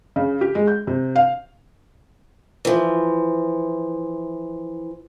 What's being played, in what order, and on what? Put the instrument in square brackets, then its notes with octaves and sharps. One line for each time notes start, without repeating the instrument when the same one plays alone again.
[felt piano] C#3
G4
G#3
G6
C3
F5
[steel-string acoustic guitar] E3 F3